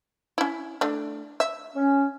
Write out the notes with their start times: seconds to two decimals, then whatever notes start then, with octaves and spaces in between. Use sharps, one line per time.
0.38 C#4 E4
0.81 A3 D4
1.40 E5
1.76 C#4